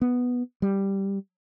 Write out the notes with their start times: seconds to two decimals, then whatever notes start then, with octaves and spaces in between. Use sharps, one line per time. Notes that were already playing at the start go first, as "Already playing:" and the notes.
0.01 B3
0.62 G3